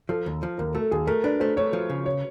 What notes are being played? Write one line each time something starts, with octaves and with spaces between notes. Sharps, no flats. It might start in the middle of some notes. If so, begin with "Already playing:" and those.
F3 A4
D#2
F3
D#2 A#4
A3 A4
D#2 G#4
A3 A#4
D4 B4
A3 C5
A3 C#5
F3
C#3
C#5